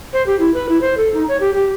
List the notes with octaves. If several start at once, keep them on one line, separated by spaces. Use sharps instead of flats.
C5
G4
E4
B4
E4
C5
A4
D#4
C#5
G4
G4